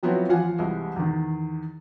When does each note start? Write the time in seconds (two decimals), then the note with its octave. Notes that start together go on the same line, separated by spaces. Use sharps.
0.03 F3 F#3 B3 C4 E4 F#4
0.29 A1 F3 F5 F#5 G#5
0.59 C2 E3 G3 G#3
0.96 E2 D#3